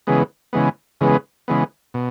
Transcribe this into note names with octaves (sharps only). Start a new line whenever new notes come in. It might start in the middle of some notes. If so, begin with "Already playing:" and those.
C#3 E3 G#3 B3
C#3 E3 G#3 B3
C#3 E3 G#3 B3
C#3 E3 G#3 B3
B2